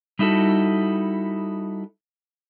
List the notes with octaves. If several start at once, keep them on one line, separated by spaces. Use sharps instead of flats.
G3 D#4 E4 F#4 A4